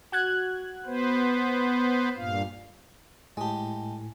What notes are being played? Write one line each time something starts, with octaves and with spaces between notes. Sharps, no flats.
F#4 F#6 G#6
B3 B4 C5
G2 A#2 F5
A2 G#3 G4 G#5 A5